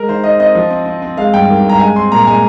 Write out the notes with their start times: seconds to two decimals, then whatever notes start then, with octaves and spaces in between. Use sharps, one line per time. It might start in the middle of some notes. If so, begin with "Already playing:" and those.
Already playing: G#3 A#4
0.08 D#3 C5
0.24 D#3 D#5
0.40 C4 D#5
0.55 F3
0.70 C4
0.86 C4
1.02 C4
1.17 G#3 F5
1.34 G2 G5
1.49 D#3
1.64 G2
1.69 A#5
1.79 G#3 G#5
1.96 C4 C6
2.12 A#2 A#5
2.27 G#3 G#5